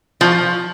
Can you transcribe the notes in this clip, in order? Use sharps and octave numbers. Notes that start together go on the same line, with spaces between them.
F3